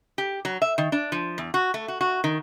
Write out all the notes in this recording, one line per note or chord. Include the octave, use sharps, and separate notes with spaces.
G4
F#3
E5
D#3
D4
F3
E2
F#4
A3
F#4
F#4
D#3